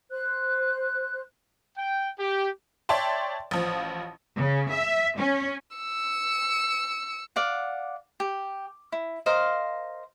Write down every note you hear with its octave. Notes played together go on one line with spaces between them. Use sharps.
C5 F#6
G5
G4
C#5 D5 E5 G5 A5 C6
A1 F3
C#3
E5
C#4
E6 C#7
D5 F5 F#5
G4
E4
A#4 C5 D#5 F5